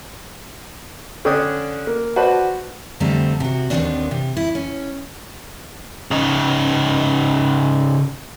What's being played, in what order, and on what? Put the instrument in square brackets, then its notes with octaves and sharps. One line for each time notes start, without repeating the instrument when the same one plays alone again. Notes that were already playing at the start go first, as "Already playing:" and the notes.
[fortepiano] D3 C#4 D4 G5 D#6
A#3
F#4 B4 C5 D5 A5 B5
[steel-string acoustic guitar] F2 D3 G3 A3 C4 A#5
C3 F#4
D#2 D#3 F3 B3 C4 D4
C3
E4
C#4
[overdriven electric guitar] C#3 D#4